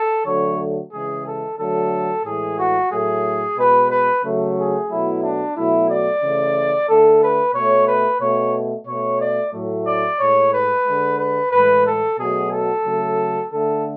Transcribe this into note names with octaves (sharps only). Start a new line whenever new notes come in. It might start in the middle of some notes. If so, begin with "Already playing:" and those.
Already playing: A4
D3 F#3 A3 C#5
C#3 E3 G#3 G#4
A4
D3 F#3 A3 A4
A2 E3 G#3 G#4
F#4
A2 F#3 A3 G#4
B2 G#3 B4
B4
C#3 F#3 A3
G#4
B2 F#3 A3 E4
D4
B2 F#3 A3 E4
D5
C#3 E3 A3
D3 A3 A4
B4
B2 A3 C#5
B4
B2 A3 C#5
B2 A3 C#5
D5
A2 F#3 A3
D5
A2 G#3 C#5
B4
G#3
D3
B4
A2 E3 G#3 B4
A4
B2 F#3 A3 G#4
A4
C#3 F#3 A3
D3 A3 A4